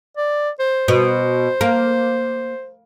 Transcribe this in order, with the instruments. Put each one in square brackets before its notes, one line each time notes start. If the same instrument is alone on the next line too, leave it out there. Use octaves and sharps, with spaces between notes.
[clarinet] D5
C5
[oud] B2
A#3